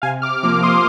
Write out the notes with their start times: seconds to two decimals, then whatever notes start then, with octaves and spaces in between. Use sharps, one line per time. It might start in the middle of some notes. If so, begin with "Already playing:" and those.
0.02 C3 F5 G#5
0.22 D6 F6
0.43 F3 A#3 D6 F6
0.63 C6 D#6